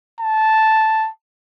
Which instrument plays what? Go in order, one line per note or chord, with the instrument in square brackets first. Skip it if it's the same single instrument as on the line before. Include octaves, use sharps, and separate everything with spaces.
[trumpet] A5